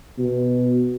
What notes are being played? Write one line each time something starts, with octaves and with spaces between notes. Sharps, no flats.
B2